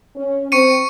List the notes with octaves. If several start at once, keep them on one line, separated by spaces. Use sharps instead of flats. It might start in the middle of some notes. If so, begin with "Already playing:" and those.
C#4
C4 C#6 C#7 D#7